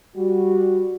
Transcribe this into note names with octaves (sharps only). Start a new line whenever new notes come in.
G3 F#4